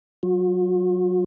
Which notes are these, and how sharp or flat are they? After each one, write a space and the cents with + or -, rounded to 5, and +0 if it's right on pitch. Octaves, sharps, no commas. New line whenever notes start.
F#3 +0 F#4 -45